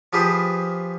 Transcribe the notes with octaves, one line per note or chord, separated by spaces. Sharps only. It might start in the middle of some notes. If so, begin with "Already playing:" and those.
F3 F4 G4 G#4 B4 C5